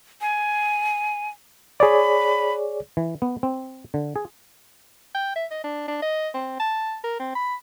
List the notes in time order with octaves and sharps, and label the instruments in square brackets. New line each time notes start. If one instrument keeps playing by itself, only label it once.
[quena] G#5
[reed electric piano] G#4 C#5 D5 [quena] B5
[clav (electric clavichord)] E3
B3
C4
D3
G#4
[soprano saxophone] G5
E5
D#5
D4
D4
D#5
C4
A5
A#4
C4
B5